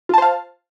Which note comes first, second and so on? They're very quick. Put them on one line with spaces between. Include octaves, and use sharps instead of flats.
F4 A5 C5 F5